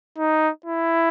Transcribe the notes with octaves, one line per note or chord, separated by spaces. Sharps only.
D#4
E4